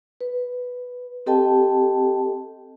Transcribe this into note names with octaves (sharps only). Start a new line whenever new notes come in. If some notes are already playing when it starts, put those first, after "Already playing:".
B4
C4 G4 A4 D#5 G5 A5